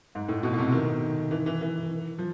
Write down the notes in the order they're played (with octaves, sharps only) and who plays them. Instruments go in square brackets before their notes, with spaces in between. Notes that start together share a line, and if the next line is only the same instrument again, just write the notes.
[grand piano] G#2
A2
B2
B2
C3
D#3
E3
E3
E3
F3